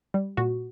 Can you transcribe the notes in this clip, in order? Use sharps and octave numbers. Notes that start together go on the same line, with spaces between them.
G3
A#2 F#4